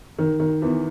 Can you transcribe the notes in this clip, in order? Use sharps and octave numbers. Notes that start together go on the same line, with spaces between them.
D#3
D#3
E2 E3